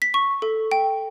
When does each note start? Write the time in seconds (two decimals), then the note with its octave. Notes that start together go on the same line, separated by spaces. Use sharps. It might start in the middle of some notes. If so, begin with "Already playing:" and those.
0.02 B6
0.14 C#6
0.42 A4
0.72 G5